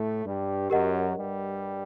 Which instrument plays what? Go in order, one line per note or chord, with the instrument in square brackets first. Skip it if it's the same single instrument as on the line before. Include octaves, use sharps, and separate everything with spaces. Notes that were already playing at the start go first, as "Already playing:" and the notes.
Already playing: [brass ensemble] A2 A3
G2 G3
[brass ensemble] F#2 F#3 [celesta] G4 A#4 D#5 F#5
[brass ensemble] G2 G3